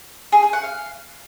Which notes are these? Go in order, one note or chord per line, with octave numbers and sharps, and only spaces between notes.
G#4
G#4
F#5
F5